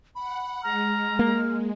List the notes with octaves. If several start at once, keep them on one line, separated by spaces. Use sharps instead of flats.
F#5 B5
G#3 A#5 F6
A#3